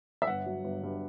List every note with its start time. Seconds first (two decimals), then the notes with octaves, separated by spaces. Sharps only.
0.22 E5
0.27 G1 F#5
0.46 F#3
0.64 G1
0.83 G2